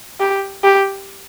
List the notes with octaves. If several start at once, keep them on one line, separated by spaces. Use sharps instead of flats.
G4
G4